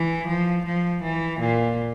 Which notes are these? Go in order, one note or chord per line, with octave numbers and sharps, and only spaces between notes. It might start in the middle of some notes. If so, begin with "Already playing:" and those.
Already playing: E3
F3
F3
E3
A#2